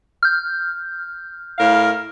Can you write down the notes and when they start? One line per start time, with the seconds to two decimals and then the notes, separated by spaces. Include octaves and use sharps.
0.23 F6 G6
1.59 A2 A#4 F5